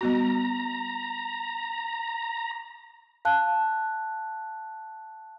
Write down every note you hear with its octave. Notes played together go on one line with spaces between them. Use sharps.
G3 B3 F#4 A#5
F5 A5 F#6